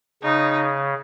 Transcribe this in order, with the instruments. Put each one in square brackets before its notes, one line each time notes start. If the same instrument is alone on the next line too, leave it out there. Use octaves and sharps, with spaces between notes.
[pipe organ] C#3 [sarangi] D#4